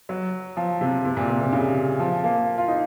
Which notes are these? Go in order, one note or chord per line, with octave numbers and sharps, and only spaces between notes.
F#3
F3
C3
C3
A#2
C3
C3
C#3
F3
A#3
F4
D#4